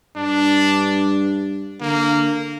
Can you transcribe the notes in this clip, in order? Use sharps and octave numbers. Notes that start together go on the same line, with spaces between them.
G2 D4
D3 A#3